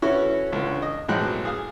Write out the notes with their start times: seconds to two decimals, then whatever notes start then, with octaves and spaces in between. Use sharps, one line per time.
0.02 C#4 E4 F#4 A4 B4 C#5
0.52 C#2 D3
0.82 D#5
1.08 B1 F2 A2 G#3 G5 F#6
1.45 G#4 F5